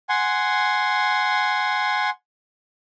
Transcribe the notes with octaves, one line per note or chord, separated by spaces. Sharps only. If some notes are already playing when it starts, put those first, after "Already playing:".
F#5 G#5 C6